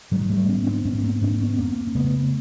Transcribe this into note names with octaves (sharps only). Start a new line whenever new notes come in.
G#2 F#3 G#3
G3 A3
G#2 B3 C#4
C4 D4
G#2 B3 C#4
A#3 C4
G#2 C4 D4
B3 C#4
F2 A#3 C4
C4
C#3 A3 B3